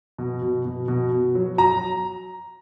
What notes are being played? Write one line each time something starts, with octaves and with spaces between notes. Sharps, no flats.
B2
B2
B2
B2
B2
F#3
F#3 A#5